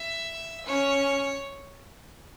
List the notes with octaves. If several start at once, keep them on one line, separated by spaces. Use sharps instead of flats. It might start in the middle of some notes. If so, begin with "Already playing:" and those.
Already playing: E5
C#4 C#5